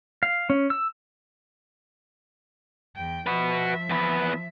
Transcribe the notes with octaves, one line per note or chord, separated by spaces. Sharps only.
F5
C#4
E6
E2 G5
F3 F#4 B4 E5
E2 B4